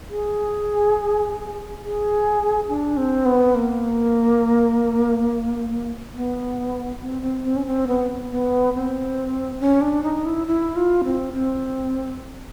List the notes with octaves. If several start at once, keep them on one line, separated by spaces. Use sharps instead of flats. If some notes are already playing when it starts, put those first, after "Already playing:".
G#4
G#4
D4
C4
B3
A#3
B3
C4
C4
C4
C#4
C4
B3
B3
C4
C#4
D4
D#4
E4
E4
F4
C4
C4